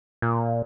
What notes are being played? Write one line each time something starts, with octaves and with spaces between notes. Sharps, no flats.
A#2